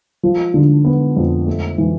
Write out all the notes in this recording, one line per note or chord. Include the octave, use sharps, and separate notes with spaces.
F3
D3
B3
F2
A3
E3